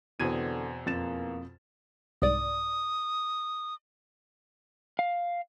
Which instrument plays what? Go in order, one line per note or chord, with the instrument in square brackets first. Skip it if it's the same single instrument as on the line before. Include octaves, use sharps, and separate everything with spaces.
[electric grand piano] E2 G#6 D#7 [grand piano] B2 C4 [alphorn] D3
[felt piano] F2 A6 E7 [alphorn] A#3
[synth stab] C2 G#2 D5 [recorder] D#6
[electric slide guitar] F5